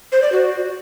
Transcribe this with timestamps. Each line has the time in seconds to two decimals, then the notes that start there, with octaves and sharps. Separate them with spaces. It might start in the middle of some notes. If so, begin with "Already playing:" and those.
0.12 C5
0.22 D5
0.32 F#4